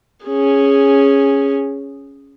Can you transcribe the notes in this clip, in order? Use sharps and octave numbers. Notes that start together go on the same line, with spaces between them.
C#4 G#4